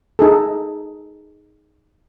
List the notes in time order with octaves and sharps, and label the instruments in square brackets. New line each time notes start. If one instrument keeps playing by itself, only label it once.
[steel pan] D#4 G#4 A4